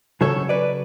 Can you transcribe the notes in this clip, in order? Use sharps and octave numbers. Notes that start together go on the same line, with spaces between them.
C#3 F#3 A4 C#5
B4 D5